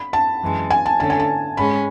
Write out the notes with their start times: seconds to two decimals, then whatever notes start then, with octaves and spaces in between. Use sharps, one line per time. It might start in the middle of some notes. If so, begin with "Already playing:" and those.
Already playing: B5
0.13 A5
0.42 F#2 E3 G#3
0.70 G#5
0.86 A5
1.00 D3 A3 C#4 A5
1.10 G#5
1.20 A5
1.57 G#2 G#3 C#4 B5